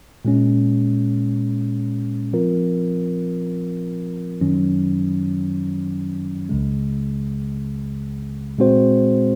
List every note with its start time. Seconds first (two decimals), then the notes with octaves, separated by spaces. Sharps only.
0.25 A#2 G#3 C#4
2.33 F3 C4 F4 A#4
4.41 F#2 D#3 F#3 C#4
6.49 C#2 C#3 G#3
8.58 A#2 G#3 C4 F#4 C5